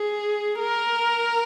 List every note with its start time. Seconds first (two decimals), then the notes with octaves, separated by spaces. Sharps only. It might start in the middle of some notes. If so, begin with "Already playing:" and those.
Already playing: G#4
0.60 A#4